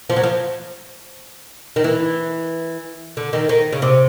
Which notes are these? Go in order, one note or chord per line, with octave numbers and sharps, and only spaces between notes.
F3
F#3
F3
D#3
E3
D3
D#3
D#3
C#3
C3